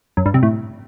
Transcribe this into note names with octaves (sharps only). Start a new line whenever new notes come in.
F#2
G2
C3
A2